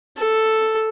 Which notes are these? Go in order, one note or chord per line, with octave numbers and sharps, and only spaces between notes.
A4